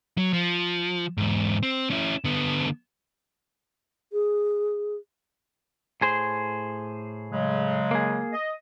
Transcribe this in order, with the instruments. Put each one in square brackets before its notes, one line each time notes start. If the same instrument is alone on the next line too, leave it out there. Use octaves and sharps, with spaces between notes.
[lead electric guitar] F#3
F3
E2 G#2
C4
C#4 E4
D3 B3
[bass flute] G#4
[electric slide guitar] A2 G#4 C5
[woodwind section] C#3 F#3 G#3
[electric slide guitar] A#3 G#4
[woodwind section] D#5